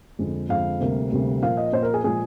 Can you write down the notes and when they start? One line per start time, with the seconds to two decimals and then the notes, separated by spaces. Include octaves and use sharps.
0.19 F2 D3 G#3
0.49 F2 D3 G#3 F5
0.80 D2 C3 G3 A#3
1.12 D2 C3 G3 A#3
1.42 A#2 F3 A#3 F5
1.57 D#5
1.72 A#2 F3 A#3 C5
1.83 A#4
1.94 G#4
2.04 A#2 F3 G#3 G#4